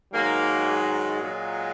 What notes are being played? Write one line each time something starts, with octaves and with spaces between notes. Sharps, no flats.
G#2 D#3 F#3 A#3
G#3
A#2 F#3